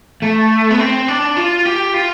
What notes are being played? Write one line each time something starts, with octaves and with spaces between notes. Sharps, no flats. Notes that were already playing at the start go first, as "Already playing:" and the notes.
A3
B3
C4
D4
F4
G4
F4